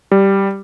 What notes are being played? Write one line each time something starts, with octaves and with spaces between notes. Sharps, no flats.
G3